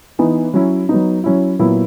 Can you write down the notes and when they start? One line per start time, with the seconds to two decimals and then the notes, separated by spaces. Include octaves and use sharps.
0.19 E3 B3 D#4
0.54 F#3 C#4 E4
0.89 F#3 B3 D#4
1.24 F#3 C#4 E4
1.59 A#2 F#3 B3 E4